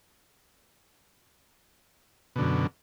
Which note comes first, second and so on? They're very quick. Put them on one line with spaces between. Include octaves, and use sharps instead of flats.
B2 D3 F#2